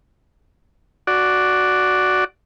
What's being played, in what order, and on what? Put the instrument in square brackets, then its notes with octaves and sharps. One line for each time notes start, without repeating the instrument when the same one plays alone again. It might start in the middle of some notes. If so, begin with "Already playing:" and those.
[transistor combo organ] F#4 D5